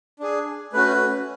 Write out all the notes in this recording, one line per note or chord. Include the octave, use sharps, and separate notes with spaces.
D4 G#4
A3 C#4 F#4 B4